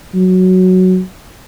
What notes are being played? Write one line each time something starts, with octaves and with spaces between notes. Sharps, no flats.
F#3